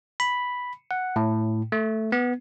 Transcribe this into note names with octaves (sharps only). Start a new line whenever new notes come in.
B5
F#5
A2
A3
B3